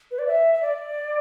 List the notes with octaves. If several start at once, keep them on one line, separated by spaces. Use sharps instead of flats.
B4
D5
E5
E5
D5